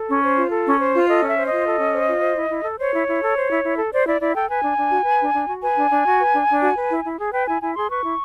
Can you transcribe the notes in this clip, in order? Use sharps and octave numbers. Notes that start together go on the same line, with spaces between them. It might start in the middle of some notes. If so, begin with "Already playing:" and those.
Already playing: A4
C#4
C5
F4
A4
C#4
C5
F4
A4 D#5
C#4 E5
C5
D#5
F4
A4
C#4
C5
F4
C5
E4
E4
A4
C5 C#5
E4
E4
A4
C5
E4
E4
A4
C5 D5
E4 D5
E4 D5
A4 G5
B4 G#5
D4
D4
F#4
B4
D4
D4
F#4
B4 G#5
D4
D4
F#4
B4
D4
D4
F#4
B4
E4
E4
G#4
B4 G5
E4 G#5
E4 G#5
G#4 C6
B4 C#6
E4